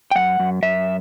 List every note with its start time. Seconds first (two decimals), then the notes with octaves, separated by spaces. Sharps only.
0.11 G5
0.15 F#2 F#5
0.39 F#2
0.62 F#2 E5